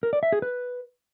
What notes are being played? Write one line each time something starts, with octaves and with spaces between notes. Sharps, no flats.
A#4
D5
E5
G#4
B4